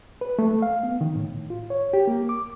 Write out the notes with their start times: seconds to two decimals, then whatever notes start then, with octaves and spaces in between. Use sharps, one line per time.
0.21 B4
0.39 A3
0.62 F5
0.83 B3
1.01 D#3
1.16 A2
1.50 F4
1.70 C#5
1.93 G4
2.07 A#3
2.29 D6